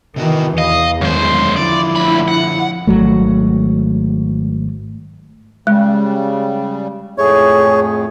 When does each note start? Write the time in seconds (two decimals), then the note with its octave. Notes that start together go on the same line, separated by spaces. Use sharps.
0.16 C3 D#3 E3 B3 F#4
0.58 E2 D#5 F5
1.01 F#2 D#3 G#3 B3 C5
1.56 D3 F3 E4 D5
1.96 D2 B5
2.28 F#5
2.87 G#1 C#2 F#3 A3
5.67 C#3 G3 G#3
7.18 F2 A2 A3 G#4 C#5